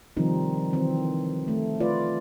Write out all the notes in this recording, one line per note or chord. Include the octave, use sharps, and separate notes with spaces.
C3 D#3 F3 G3 C4 D#4
D#3 E3 C4
A3
A3 F4 B4 D5